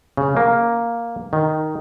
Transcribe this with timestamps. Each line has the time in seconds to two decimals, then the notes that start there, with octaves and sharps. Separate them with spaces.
0.17 C#3
0.37 A#3
1.33 D#3